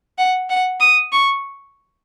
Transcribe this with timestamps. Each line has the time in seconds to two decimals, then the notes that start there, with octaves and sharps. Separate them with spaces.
0.18 F#5
0.50 F#5
0.80 D#6
1.12 C#6